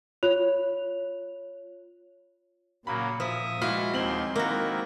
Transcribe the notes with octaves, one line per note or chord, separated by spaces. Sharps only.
F4 C#5 F#6 F7
A#2 C#3 F#3 A#3 B5
F3 E5 D#6
A#2 G#3 E4 F#4 F5
D#2 C4 C6 F#7
D#3 A#3 E4 F#4